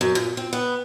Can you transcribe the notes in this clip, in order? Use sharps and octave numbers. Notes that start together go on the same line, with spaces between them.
F#2
A#2
C4
B3